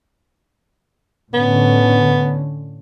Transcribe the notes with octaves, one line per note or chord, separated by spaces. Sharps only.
A2 D3 B3 C#4